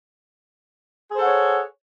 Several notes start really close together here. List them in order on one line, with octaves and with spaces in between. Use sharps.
G#4 C5 A4 F#5 C#5